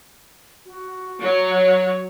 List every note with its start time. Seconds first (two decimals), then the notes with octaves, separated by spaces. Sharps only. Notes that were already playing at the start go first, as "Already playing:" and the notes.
0.66 F#4
1.20 F#3 C#5